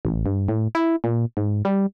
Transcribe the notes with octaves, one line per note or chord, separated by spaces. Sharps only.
A1
G2
A2
E4
A#2
G#2
G3